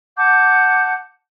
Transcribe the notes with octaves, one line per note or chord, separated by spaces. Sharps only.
F#5 A5 D6 G6